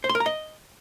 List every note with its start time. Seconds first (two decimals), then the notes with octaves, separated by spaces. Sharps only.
0.04 C5
0.09 C6
0.15 A#4
0.20 A#5
0.26 D#5